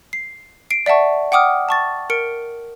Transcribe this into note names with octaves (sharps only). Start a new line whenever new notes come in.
C7
C7 D7
D5 E5 F#5 A5 C#6
F#5 G5 D6 D#6 F6
A5 C#6 A6
A#4 C#7 D7